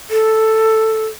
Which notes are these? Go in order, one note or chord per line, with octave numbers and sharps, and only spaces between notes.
A4